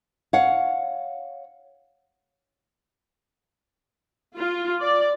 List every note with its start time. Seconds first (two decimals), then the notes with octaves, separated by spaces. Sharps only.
0.33 C#5 F5 F#5
4.35 F4
4.81 D5